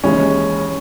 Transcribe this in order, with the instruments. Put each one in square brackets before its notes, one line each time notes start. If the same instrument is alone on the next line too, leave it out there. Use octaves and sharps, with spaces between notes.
[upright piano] D#2 C#3 E3 G#3 [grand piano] C#4